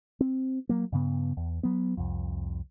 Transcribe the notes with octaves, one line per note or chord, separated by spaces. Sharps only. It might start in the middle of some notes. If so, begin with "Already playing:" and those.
C4
F#3 A#3
G2 C#3 B3
E2
F#3 B3
C2 F2